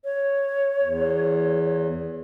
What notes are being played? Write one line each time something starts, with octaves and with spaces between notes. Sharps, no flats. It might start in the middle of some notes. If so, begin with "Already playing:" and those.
C#5
E2